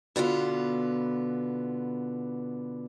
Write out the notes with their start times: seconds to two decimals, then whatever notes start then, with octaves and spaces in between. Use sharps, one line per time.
0.16 B2 D3 B3 F4